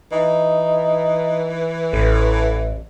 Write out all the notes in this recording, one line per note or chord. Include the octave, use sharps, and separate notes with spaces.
E3 D#4
A1 A2